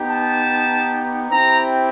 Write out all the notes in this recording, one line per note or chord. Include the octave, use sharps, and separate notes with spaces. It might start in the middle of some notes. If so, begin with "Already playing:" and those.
Already playing: B3 D#4 G4
A5
C4 E4 G4 A#5